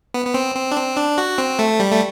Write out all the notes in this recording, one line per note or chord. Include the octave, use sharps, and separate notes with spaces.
B3
B3
C4
C4
D4
C4
D4
F#4
C4
A3
G3
A3